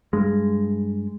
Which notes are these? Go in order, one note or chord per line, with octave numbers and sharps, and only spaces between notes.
G2 G#3